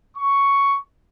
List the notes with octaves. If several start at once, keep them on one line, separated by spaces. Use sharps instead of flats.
C#6